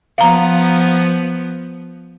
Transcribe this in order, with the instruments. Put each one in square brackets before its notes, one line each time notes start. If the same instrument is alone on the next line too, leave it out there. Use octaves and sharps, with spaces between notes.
[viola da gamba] F3 B3 [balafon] F5 A#5